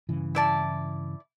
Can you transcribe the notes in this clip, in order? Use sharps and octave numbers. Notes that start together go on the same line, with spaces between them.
G2 C#3 E3
E4 D5 A5